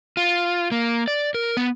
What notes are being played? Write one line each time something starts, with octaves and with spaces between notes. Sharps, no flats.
F4
A#3
D5
A#4
B3